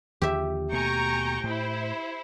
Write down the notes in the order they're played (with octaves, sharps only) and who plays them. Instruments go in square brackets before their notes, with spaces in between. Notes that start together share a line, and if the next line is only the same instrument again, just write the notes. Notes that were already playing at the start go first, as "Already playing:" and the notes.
[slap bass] D#2 D3 F3 [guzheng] G4 E5
[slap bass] D#2 B2 A3 [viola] G5 [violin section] G#5 A#5 C#6
[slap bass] A2 [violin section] E4 C5